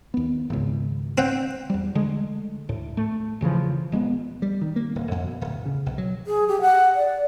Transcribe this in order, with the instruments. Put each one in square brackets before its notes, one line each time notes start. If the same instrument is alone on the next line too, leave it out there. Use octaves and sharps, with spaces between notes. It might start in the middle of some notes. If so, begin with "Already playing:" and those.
[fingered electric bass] D#2 B3
G#1 C#2
[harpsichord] C4 F#5 G5
[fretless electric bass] E2 G3
D3 G#3 A3
D2 A2
A3
E1 C#3 E3 F3
D#1 G#3 A#3 B3
[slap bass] G3
D#3
A#3
D1
F2
B2
D1
C#3
B1
F#3
[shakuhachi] G#4
G4
F#5
D5